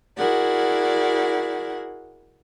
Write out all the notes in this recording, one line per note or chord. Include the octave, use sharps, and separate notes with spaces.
E4 F#4 G#4 A#4 D5 F#5